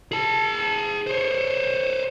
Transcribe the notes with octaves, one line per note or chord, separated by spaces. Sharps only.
G#4 A5
C5 C#5